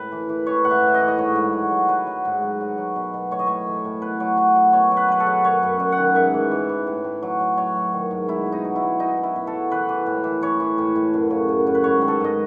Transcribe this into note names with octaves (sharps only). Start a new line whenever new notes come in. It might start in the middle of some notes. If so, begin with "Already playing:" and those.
Already playing: A2 B4
E3
E3
E3 C#5
A2 F#5
E5
A2
E5
D#5
E3
D#5
G#2 C#5
G#2
F#3
F#3
F#3 B4
F#3
G#2
F#3
F#3
F#3
B2
B2
A2 C#5
D#5
A2 C#5
E3
A2
B2 B4
F#3
F#3
F#3
B2 C#5
F#3
B4
F#3 B4
A4
F#3
F#2 C#5
F#2
F#2
F#5
D#3
G#2 E5
E3
E3
E3
A2
A2
F#3
F#3
F#3 C#5
F#3
D#3
G#2
B2 E4
B2
D#4
F#3
E4
F#3
B2 D#4
B2
E4
B2
A4
F#3
E3 B4
E3
A2
E3
E3 C#5
E3
A2
A2
F#2
C#3
F#2
F#2
B4
G#2 C#5
D#3
A4
G#2 D#5